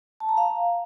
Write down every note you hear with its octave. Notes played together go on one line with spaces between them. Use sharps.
A5
A#5
F5